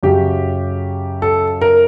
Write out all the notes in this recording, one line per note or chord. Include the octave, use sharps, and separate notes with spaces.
F#2 C#3 F#3 G4
A4
A#4